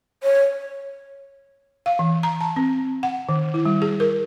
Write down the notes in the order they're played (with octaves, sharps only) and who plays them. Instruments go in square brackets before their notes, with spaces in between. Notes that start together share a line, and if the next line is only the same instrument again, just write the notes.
[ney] C#5
[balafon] F5
E3
A#5
A5
C4
F#5
D#3
E4
G3
G#4
A#4